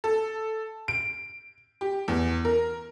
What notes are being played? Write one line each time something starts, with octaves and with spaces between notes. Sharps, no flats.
A4
D7
G4
E2
A#4